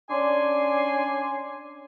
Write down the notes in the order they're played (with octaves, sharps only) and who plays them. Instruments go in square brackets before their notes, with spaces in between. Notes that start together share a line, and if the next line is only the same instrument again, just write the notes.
[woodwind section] C#4 D4 D5 G#5 C6